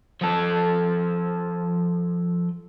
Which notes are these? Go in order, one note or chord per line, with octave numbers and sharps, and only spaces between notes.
F3 A4